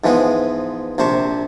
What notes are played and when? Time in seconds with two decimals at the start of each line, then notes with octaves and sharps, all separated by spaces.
0.04 G#2 E3 F3 G#3 B3
0.98 A#1 C3 C5 A5 C#6